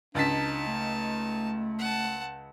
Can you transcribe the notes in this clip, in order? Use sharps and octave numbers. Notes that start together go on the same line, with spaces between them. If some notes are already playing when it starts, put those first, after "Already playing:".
C#2 D4 D#4 A5 A6 B6
A3
F#5 A5